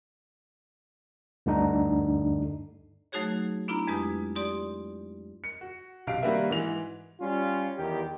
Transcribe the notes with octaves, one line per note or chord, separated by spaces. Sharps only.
D2 G2 D3 D4 D#4
F#3 A3 D#4 F#4 G#4 C#5
B3 D4 E4 F4 A#5
F2 G#3 G4 B4 D#6
G4 D5 C6 D#6
C#7
F#4
B1 C3 F5 D7
D#3 G3 A#3 F#4 B4 E5
G#2 E3 F7
G3 C#4 F4
E2 D#3 G4